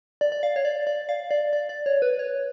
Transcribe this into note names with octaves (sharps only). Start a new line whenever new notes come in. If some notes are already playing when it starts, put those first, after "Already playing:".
D5
D5
F5
C#5
D5
D5
F5
D5
D5
D5
C#5
B4
C#5